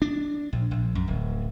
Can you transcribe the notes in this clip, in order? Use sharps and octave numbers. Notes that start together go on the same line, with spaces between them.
D4
A#1
A#1
F#2
D1